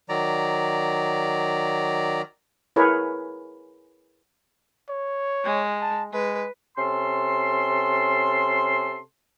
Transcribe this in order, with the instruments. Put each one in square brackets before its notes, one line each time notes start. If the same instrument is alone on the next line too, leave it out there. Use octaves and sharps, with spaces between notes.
[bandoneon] D#3 F#3 D5 A#5
[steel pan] E4 G#4 A#4 B4 C#5
[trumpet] C#5
[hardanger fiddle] G#3
[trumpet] A5
[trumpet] G#3 [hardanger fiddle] B4
[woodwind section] C3 C#4 A4 C6